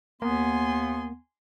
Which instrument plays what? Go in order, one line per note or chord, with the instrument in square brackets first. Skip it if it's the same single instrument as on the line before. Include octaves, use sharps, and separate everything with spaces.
[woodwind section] D#2 B3 [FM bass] A#3 [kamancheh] G#5 C6